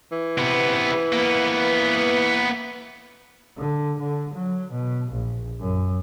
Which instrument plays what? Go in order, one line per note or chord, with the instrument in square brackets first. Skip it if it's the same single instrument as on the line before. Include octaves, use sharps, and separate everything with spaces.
[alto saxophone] E3
[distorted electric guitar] C3 B3
A#3 B3
[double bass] D3
D3
F#3
B2
A#1
F#2